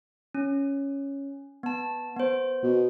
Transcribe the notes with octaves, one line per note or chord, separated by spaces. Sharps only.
C#4
B3 A5
B3 C5
B2